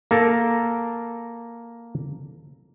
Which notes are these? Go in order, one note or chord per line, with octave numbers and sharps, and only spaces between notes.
A#3 A4 A#4